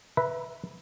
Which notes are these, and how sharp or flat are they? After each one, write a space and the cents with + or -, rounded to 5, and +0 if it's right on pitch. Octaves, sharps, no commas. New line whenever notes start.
B4 +0 E5 +0 A#5 +45